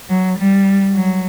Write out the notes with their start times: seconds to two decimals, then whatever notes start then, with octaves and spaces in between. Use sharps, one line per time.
0.09 F#3
0.38 G3
0.95 F#3